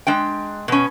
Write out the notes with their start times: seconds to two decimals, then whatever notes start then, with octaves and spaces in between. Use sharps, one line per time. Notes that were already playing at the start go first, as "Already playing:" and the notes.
0.07 G#3 D4 G5
0.68 B2 C#4